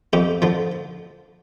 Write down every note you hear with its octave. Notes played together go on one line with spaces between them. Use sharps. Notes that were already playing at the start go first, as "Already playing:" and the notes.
F2 G4
D3 F3